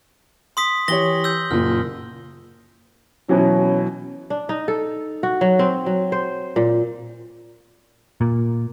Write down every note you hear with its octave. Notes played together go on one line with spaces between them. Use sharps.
C6 D#6 B6
E3 G4 C#5 A#6 F#7 G7
E6 G6
F#1 A#2 F6
B2 E3 F#3 C#4
D4
D#4
A4
F#4
F#3
C4
F#3
C5
A#2
A#2